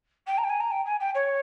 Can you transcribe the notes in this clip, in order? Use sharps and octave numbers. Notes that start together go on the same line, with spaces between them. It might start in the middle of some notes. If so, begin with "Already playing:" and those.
G5
A#5
G5
G#5
A#5
G5
G#5
G5
C#5